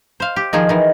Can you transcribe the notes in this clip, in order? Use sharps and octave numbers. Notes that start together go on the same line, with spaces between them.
C5 F5
G4
D#3 F3 G#4
D#3 E3